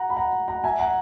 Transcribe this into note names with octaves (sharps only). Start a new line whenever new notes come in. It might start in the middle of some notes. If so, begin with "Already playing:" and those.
Already playing: F#5 A#5
B5
F#5 A#5
F#5 A#5
E5 G#5
F#5 A#5